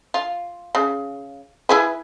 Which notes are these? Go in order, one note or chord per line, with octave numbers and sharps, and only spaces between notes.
F4
C#3
E4 G#4 B4